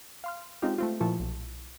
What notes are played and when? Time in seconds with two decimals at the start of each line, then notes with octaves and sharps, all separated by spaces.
0.24 F5 C6 F6
0.62 G#3 C4 C#4 D#4 F4 G4
0.78 A3 C4 F4
1.00 A#2 F3 E4 A5 C#6
1.20 B1